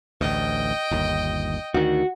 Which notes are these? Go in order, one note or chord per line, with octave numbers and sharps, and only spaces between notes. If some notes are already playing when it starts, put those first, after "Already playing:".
A1 D2 D#5 G5
G1 D#2
D2 D#3 F#4